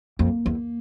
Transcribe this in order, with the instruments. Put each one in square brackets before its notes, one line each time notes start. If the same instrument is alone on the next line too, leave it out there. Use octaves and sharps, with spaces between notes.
[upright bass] F2 [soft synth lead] A#3
[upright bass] E2